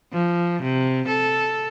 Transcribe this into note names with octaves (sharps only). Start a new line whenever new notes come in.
F3
C3
A4